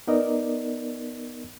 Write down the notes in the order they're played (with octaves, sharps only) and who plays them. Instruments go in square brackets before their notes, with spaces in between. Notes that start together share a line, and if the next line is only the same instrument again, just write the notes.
[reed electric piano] B3 D#4 A#4 D5 D#5